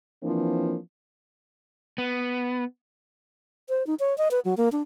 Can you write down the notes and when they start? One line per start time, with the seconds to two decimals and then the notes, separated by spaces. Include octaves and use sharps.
0.22 E3 F3 A#3 C4 D4
1.98 B3
3.69 C5
3.87 D#4
4.00 C#5
4.18 D#5
4.31 B4
4.45 F#3
4.57 A#3
4.72 D4